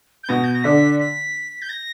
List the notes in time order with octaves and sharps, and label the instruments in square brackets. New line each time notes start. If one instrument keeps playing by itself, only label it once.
[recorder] G6
[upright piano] B2 B3 [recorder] A#6
[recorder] G6
A#6
[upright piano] D3 D4 [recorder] B6
[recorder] B6
G6
A#6